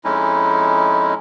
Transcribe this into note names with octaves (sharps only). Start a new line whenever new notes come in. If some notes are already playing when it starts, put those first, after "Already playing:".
F2 G#3 C#4 D#4 E4